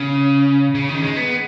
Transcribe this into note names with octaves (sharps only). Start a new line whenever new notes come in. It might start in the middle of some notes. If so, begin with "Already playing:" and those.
Already playing: C#3
C#3
D#3
G#3
B3